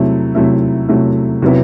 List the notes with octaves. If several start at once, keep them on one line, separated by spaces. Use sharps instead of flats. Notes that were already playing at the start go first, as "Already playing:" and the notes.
Already playing: C3 F#3 A3 E4
C3 F#3 A3 E4
C3 F#3 A3 E4
C3 F#3 B3 E4